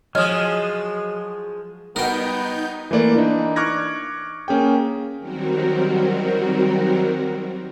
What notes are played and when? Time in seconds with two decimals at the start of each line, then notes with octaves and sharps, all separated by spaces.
0.15 F3 F#3 G#3 G#4 C#5 D#5 D#6 F6
1.96 G3 B3 D#4 F#4 A#4 F#5 G5 G6
2.91 E3 A3 A#3 D5
3.16 E3 D4 D#4
3.56 C#6 D6 F6 F#6 G#6 A#6
4.48 A#3 C#4 G#4 G5
5.18 D#3 F#3 G3 C4 F#4 A#4